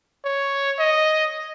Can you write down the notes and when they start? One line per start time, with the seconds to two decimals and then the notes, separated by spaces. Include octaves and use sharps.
0.25 C#5
0.79 D#5